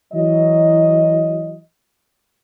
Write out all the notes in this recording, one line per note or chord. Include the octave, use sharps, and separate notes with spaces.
E3 F#3 D#5